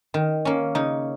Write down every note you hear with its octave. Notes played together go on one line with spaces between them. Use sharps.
D#3
A#3 C#4
C#3 D#4